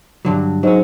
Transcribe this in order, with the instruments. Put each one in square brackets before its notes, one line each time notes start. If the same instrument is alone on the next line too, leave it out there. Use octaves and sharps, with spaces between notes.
[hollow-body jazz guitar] G2 D3 F#3
[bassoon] G#2 [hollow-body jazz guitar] F#3 C#4